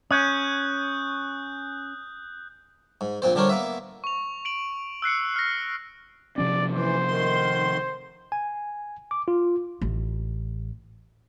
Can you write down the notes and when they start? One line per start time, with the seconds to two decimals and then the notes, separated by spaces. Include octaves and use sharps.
0.11 C#4 D#6 F#6 G6
3.01 G#2
3.22 A#1 A#2 C4 C5
3.35 D3 G3 D4 A#4 C5 C#5
3.49 A#3 B3 E5
4.04 C#6 F7
4.45 D7 F#7
5.02 E6 F#6 C7 C#7
5.36 F6 A#6
6.38 C3 F3 C#4 D5
6.72 E3 C5
7.08 D#3 C6
8.32 G#5
9.11 D6
9.28 F4
9.81 A1